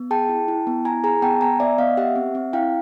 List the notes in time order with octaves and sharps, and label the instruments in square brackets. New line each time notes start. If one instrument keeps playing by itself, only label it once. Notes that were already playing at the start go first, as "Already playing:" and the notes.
Already playing: [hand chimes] B3
G#4 G5 A5
E4
E4
B3
E4 G#5 A#5
G#4 G#5 A#5
B3 G5 A5
B3 G#5 A#5
B3 D5 E5
B3 D#5 F5
G4 E5 F#5
C4
C4
E4 F5 G5